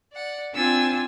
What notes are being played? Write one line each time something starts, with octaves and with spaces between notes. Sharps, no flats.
D5 F#5
C4 D4 F4 G#5 E6 A6